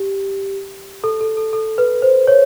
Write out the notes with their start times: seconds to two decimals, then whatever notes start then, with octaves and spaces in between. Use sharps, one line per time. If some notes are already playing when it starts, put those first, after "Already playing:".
Already playing: G4
1.04 A4
1.21 A4
1.37 A4
1.53 A4
1.78 B4
2.02 C5
2.27 C#5